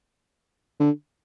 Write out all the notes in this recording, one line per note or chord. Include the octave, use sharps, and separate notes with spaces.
D3